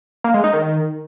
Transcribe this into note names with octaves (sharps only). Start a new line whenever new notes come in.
A#3
G#3
D#4
D#3